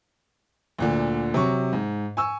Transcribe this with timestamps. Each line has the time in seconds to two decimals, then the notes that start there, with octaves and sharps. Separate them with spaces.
0.78 D2 A#2 D3
1.34 C3 F#3 C#6
1.73 G#2
2.17 G#5 C#6 E6